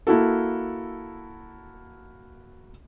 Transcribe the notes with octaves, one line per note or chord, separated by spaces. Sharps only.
A#3 E4 F#4 A4